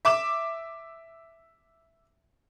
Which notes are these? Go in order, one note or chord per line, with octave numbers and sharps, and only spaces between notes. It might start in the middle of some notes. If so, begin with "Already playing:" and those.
E5 D6 E7